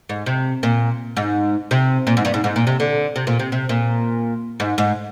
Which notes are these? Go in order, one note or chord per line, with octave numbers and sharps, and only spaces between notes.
G#2
C3
A#2
G#2
C3
A#2
G#2
G2
G#2
G#2
A#2
C3
D3
C3
A#2
C3
C3
A#2
G#2
G#2